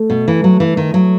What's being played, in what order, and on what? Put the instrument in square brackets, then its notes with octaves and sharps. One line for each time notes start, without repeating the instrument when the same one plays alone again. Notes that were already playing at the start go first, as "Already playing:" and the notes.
Already playing: [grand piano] A3
[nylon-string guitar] B2
E3
F#3
E3
D#3
F#3